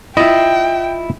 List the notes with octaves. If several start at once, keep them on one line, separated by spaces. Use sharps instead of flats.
E4 F4 D#5 E5 G5